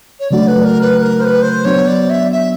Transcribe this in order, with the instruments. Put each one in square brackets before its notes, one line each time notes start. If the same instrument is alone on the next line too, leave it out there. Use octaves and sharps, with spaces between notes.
[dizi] C#5
[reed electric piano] C#3 F#3 A3 D4 F#4 [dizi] D5
[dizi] B4
A#4
B4
B4
A#4
C5
B4
C5
[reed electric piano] F#3 B3 D4 F#4 [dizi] C#5
[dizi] D5
E5
E5